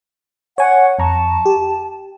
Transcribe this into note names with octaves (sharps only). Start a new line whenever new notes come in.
C#5 F#5 G#5 C#6
F2 A5 A#5 C#6
G4